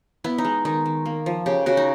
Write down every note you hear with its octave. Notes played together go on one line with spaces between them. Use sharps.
B3 E4
D#4
G#3
D#3 D#4
D#3
A#3
F3
C#3 G4
C#3 F#4
D#4